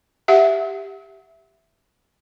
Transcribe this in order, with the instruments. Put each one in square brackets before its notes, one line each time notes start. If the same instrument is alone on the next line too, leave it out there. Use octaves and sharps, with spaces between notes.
[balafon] G4 E5 F#5